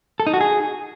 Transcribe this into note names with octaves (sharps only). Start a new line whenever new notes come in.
A4
D#4
F#4
G#4